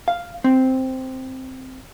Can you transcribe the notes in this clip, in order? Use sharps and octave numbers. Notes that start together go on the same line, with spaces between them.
F5
C4